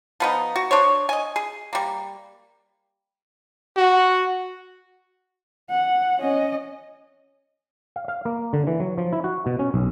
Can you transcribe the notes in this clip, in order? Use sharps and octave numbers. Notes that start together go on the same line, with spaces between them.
F3 B3 D#4
F#4
D4 C5 C#5
D#5 G#5
G#4
G3 A#3
F#4
F#5
C#4 D#5
F5
F5
A#3
D3
E3
F#3
F3
E4
F#4
B2
C#4
B1